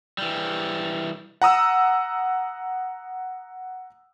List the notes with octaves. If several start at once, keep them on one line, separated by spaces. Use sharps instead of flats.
E3 G3
F#5 A#5 D#6 E6